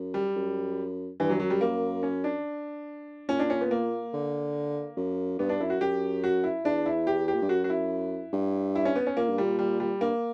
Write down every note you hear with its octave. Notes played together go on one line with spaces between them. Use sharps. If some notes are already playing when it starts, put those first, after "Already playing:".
Already playing: F#2
G3
F#2
G2 E3
F#3
F#2 F#3
G3
F#2 A#3
C#4
D4
A#2 C#4
D4
C#4
B3
A#3
D3
F#2
G2 B3
D4
F#2 E4
F#4
F#2 G4
F#4
E4
E2 D4
E4
G4
G4
A#2
G2
F#2 F#4
F#4
E4
G2
E4
C#4
B3
C#4
A#2 A#3
G2
A#2 G3
G3
G3
G2 A#3